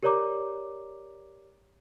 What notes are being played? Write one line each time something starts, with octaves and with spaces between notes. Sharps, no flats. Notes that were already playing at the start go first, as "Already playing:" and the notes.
G4 A#4 C#5 D5 A#5 D6